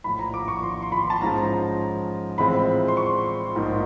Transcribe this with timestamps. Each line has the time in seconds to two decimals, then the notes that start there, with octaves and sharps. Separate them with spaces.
0.04 A#1 A2 F3 B5
0.19 A#5
0.34 D6
0.48 C#6
0.63 C6
0.82 C6
0.92 B5
1.10 A5
1.21 G#2 F3 G#3 C#4 A#5
2.38 A2 E3 G#3 C4 F4 B5
2.88 C6
2.97 C#6
3.55 A#1 G#2 F3 A#3 D#4